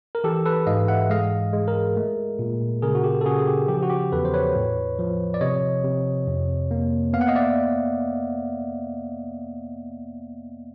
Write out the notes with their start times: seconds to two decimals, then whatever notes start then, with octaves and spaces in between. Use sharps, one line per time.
0.15 A#4
0.24 E3 G4 A4
0.45 A4 B4
0.67 G#2 D#5 F5
0.88 E5 F#5
1.10 G#3 D#5 F5
1.53 G#3
1.68 G#4 A#4
1.96 A3
2.39 A#2
2.82 C#3 G#4 A#4
2.95 F#4
3.04 G4
3.21 A4
3.26 C#3 F#4 G#4
3.39 G#4
3.47 G4
3.68 F3 G4
3.83 F#4
3.90 G4
4.12 E2 A4 B4
4.25 C5
4.34 B4 C#5
4.55 A2
4.99 F3
5.34 D5
5.41 C3 C#5 D#5
5.84 C3
6.27 F2
6.71 A#3
7.13 B3 F5
7.21 F#5
7.28 D#5 F5
7.35 D5 E5